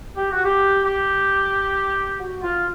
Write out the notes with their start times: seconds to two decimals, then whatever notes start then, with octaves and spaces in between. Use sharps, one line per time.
0.17 G4
0.31 F#4
0.45 G4
0.85 G4
2.20 F#4
2.43 F4